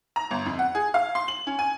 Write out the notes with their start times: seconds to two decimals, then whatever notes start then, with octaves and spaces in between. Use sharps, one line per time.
0.16 A#5
0.31 G1
0.46 F2
0.59 F#5
0.75 G#4
0.94 F5
1.15 C6
1.28 F#7
1.47 C#4
1.59 G#5